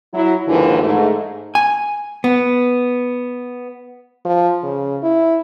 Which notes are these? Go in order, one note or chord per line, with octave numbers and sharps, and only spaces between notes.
F#3 E4
D#2 G#2 D3 E3 F3 E4
G#2 A3
G#5
B3
F3
C#3
E4